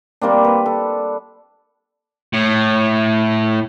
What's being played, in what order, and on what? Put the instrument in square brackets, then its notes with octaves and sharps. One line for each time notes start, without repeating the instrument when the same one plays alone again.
[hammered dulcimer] G3 A#3 C4 D4
B4
A4
[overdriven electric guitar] A2